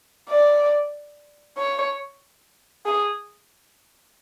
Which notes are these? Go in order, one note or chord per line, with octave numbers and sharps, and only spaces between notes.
D5
C#5
G#4